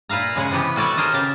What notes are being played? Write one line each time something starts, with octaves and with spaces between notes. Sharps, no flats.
A#2 B4 E5 F5 A#5
C#3 G#3 G#4 F#5
C3 E3 B3 G4 B4
G3 F#4 A4 C#5 D5
G#4 A#4 C5 D#5
C#3 G4 A5